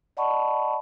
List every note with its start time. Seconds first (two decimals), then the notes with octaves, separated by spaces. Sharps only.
0.17 D5 D#5 F#5 A5 B5 C#6